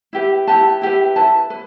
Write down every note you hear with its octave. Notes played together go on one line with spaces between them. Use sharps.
E4 G4 B4
E4 G4 B4 A5
E4 G4 B4
E4 B4 A5
B4